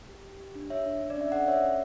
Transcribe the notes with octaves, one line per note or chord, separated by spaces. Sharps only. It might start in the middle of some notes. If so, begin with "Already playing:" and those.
G4
G4
G4
D4
D4 C#5 E5
D4
D4
D5
C#4 E5
A4 D5 F#5
C#4 C#5 E5
C#4